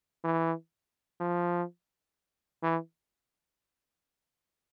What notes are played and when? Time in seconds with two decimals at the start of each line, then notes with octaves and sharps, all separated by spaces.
0.24 E3
1.20 F3
2.63 E3